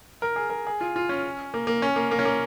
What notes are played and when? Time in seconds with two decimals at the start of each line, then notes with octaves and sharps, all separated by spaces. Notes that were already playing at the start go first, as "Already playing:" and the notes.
0.22 A#4
0.36 G#4
0.50 A#4
0.67 G#4
0.81 F4
0.96 F4
1.09 C#4
1.54 A#3
1.67 A#3
1.82 C#4
1.96 A#3
2.11 A#3
2.19 C#4
2.25 A#3